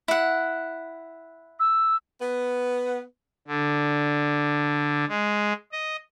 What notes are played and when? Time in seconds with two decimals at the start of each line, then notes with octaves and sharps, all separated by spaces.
0.08 E4 F#5
1.60 E6
2.21 B3 B4
3.48 D3
5.08 G#3
5.72 D#5